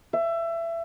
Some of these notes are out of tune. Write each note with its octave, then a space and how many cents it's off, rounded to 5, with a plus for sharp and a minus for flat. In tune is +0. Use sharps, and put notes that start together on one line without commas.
E5 +25